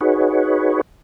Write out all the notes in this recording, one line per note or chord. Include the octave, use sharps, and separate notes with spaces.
D#4 F#4 G#4 B4 C#5